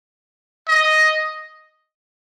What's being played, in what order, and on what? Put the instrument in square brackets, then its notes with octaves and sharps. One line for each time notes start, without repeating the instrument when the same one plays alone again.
[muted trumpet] D#5